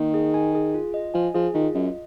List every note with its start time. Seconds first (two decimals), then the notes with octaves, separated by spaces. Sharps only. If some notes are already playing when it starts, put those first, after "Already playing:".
Already playing: D#3 A#3
0.14 G#4
0.34 G#5
0.55 G#4
0.74 F4
0.94 D#5
1.14 F3 G#5
1.34 F3 G#4
1.54 D#3 F4
1.74 F#2 D#5